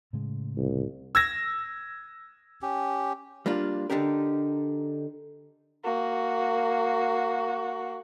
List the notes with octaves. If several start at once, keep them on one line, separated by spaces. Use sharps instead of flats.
A2 C#3 G#3
C2
E6 G#6 A#6
C#4 G4
G3 A#3 D4 F4
D3 D4 D#4 G4 A#4
A#3 F#4